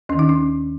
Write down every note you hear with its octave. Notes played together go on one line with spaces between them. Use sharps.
D#2 D#3 C#4
D#4
C#4